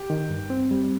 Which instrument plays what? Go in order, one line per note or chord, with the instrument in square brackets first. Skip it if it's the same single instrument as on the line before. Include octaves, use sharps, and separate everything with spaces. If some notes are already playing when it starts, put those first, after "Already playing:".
Already playing: [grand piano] G4
[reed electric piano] D#3
G2
C4
G3